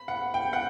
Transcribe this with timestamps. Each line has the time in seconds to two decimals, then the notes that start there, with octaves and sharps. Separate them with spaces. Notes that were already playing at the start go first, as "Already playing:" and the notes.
Already playing: B5
0.08 F#5
0.34 G5
0.53 F#5